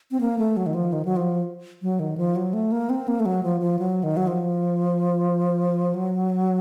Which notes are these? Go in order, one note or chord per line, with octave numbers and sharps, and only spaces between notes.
C4
A#3
A3
F#3
D#3
F3
D#3
F#3
F3
F#3
D#3
F3
F#3
A3
A#3
C4
A#3
A3
F#3
F3
F3
F#3
D#3
F#3
F3
F#3